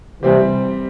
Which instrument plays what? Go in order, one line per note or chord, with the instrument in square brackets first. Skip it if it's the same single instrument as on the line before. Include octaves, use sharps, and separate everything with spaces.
[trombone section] C3 E3 [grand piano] G3 C4 G4